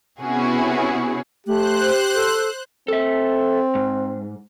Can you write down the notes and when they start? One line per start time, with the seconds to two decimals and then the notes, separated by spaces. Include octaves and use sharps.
0.21 C3 B3 C#4 E4 F#4 G#4
1.47 A3 G4 C5 F#6
2.15 A4
2.88 C4 A4 E5
3.75 G#2